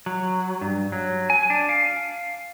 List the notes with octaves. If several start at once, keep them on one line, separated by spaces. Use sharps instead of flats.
F#3
G2
F#3
G#5
D4
F5